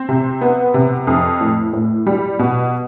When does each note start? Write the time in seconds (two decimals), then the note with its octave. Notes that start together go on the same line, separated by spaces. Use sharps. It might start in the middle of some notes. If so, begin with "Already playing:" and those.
Already playing: C4
0.09 C3
0.41 B3
0.74 C3
1.07 F2
1.41 A2
1.73 A2
2.07 G3
2.39 B2